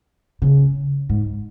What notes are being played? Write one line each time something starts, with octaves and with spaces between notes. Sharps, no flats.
C#3
G#2